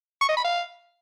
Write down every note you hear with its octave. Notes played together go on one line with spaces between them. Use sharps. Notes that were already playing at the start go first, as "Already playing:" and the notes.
C#6
D#5
B5
F5